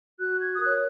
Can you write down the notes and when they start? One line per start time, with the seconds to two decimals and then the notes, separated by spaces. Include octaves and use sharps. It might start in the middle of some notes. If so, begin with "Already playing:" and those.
0.19 F#4 F#6
0.41 G#6
0.55 D#6
0.61 A#4 C#5 F#6